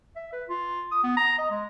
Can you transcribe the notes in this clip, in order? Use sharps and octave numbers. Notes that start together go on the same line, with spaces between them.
E5
B4
F4
D#6
B3
A#5
D#5
G#3